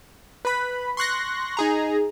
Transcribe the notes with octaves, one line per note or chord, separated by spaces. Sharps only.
B4 B5
C6 C#6 F#6 A#6
D#4 G#4 A#5